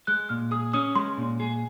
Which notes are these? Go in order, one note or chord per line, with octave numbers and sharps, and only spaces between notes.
G#3 F#6
A#2 F6
G#4 D#6
C#4 D#6
G#3 C6
A#2
G#4